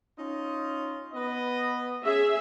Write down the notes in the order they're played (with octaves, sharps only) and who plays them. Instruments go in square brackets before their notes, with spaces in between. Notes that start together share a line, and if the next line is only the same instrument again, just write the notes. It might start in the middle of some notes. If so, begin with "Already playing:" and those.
[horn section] C#4 D#4 F4
B3 B4 D#5
[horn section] C#4 [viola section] G#4 E5